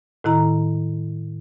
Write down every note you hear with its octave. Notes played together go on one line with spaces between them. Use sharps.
A2 D#3 E4 A#5